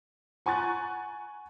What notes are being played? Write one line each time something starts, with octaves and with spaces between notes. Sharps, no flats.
F#5 G#5 A#5 C#6 F#6 A6